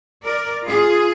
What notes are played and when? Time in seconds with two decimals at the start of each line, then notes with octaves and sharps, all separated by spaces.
0.23 A#4 D5
0.62 F4 G#4